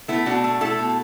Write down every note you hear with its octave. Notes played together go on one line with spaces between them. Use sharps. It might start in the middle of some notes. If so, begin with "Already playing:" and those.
A3 B3 E4
B2 D4 F#4
A3
A3 E4 A4
B2